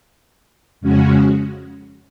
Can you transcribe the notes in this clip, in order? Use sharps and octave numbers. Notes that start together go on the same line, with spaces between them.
F2 C#3 G#3 C#4 F#4